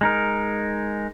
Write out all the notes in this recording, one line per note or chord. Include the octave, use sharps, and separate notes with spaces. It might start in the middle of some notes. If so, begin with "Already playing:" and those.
G#3 D#4 A#4